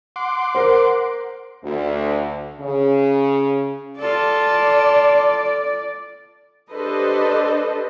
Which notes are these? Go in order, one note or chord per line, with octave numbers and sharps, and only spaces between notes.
F#5 C6 D6
A#4 C5
D2
C#3
F4 A4 D5
D4 G4 A4 B4 C5 D#5